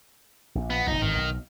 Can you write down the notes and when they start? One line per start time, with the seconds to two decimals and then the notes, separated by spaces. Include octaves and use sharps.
0.55 A#1
0.70 B3
0.87 F1 A#1 D#4
1.01 G#1 G2 D#3 E3
1.15 B1